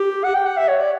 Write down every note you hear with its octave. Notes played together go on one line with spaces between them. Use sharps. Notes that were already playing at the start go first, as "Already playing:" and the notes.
Already playing: G4
F#5
G5
F#5
E5
C#5
D5